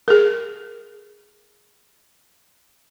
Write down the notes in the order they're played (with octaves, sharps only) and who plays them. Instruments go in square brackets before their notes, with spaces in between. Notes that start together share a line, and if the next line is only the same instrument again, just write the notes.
[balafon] G#4 A#4